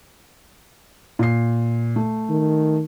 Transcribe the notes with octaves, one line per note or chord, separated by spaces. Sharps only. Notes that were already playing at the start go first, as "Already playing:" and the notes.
A#2 C7
A3
D#3